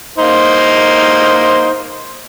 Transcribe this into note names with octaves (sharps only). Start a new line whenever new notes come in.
A#3 D#4 C5